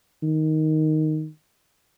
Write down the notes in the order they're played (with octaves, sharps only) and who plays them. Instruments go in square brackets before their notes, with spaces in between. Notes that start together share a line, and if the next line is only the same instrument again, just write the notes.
[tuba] D#3